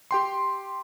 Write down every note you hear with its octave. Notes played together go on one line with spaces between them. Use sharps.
G4 G5 C6